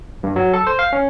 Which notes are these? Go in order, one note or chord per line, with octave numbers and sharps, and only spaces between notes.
G2
F#3
A4
C5
F5
C#4